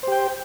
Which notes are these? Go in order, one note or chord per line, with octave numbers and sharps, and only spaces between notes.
G4 C5 G5